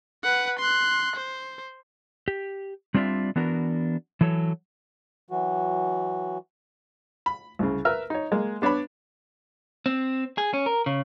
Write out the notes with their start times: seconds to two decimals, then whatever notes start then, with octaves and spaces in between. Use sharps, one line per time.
0.24 B4 F#5
0.59 C6 F#6
1.16 C5
2.28 G4
2.94 G3 C4 D4 F4 D5 E5
3.36 E3 B3 D4 F#4 A#4
4.21 E3 F#3 A4 C#5
5.30 E3 F#3 F#4
7.26 B5
7.59 C2 C#3
7.85 A#4 B4 E5 E6 F6
8.10 D#4 C#5
8.32 G#3 A#3
8.62 B3 D4 C#5 D5 B5
9.86 C4
10.38 G#4
10.53 C#4
10.66 A#4
10.86 C#3